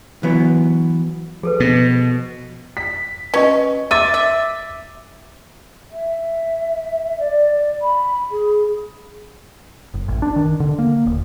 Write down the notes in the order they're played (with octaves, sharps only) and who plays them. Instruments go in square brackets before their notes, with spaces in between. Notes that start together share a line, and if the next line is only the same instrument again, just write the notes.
[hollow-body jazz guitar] E3 F#3 B3
[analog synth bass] F3 [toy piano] G#4 A4 B4
[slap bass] B2 [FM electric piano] B3
[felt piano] B6
[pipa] C#4 [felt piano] B4 D#5
[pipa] E5 [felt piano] D6 A6 D#7
[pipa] E5
[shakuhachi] E5
D5
B5
G#4
[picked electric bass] F#1
A1
D4
D#3
D3
A#3
D#1